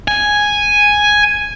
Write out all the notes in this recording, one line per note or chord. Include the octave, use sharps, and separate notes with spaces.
G#5